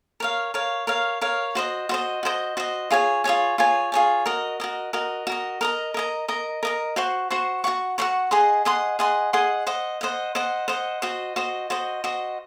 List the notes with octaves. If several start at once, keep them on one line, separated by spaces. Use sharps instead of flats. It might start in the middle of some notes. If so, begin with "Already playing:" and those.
A#4 C#5 F5
A#4 C#5 F5
A#4 C#5 F5
A#4 C#5 F5
F#4 C5 D#5
F#4 C5 D#5
F#4 C5 D#5
F#4 C5 D#5
F4 G#4 C#5 G#5
F4 G#4 C#5 G#5
F4 G#4 C#5 G#5
F4 G#4 C#5 G#5
F#4 A#4 D#5
F#4 A#4 D#5
F#4 A#4 D#5
F#4 A#4 D#5
A#4 D#5 A#5
A#4 D#5 A#5
A#4 D#5 A#5
A#4 D#5 A#5
F#4 C5 F#5 C#6
F#4 C5 F#5 C#6
F#4 C5 F#5 C#6
F#4 C5 F#5 C#6
G#4 D#5 F#5 C6
G#4 D#5 F#5 C6
G#4 D#5 F#5 C6
G#4 D#5 F#5 C6
C5 D#5 F#5
C5 D#5 F#5
C5 D#5 F#5
C5 D#5 F#5
F#4 C5 D#5
F#4 C5 D#5
F#4 C5 D#5
F#4 C5 D#5